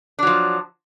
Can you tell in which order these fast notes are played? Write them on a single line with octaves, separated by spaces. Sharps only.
D4 F#3 F3